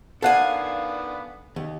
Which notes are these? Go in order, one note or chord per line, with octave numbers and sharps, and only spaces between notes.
D#3 B3 D4 A4 F5 F#5 G#5
D#2